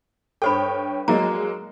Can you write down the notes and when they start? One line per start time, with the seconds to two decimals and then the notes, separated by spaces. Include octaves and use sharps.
0.42 G2 A4 C5 C#5 G5 B5
1.08 F#3 G#3 A#3 D5 D#5 A#5